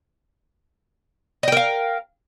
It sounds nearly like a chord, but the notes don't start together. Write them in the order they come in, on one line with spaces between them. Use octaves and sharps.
D#5 G5 A#4 F5